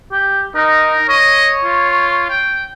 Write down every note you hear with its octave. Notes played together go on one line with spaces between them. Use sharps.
G4
D#4 A#4
C#5 D#5
F4
G5